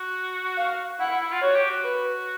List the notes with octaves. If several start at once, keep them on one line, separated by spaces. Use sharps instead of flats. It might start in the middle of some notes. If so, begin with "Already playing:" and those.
Already playing: F#4
F5
E4 F#5
E4
E4
F4
F#4 C#5
G4
F#4
B4